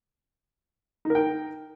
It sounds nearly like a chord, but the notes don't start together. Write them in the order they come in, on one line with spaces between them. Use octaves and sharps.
D#4 A#4 G5